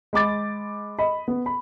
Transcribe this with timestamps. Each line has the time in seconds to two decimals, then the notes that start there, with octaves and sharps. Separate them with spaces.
0.13 G#3 B5 D6 A6
0.99 D#5 B5
1.28 B3
1.46 B5